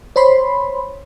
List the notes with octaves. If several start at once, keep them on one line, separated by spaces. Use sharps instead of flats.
C5 C#5 B5 C6